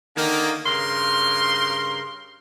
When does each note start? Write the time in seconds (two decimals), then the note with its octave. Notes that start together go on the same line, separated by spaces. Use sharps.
0.16 D3 D#3 A#3
0.65 G2 C#3 A#4 C6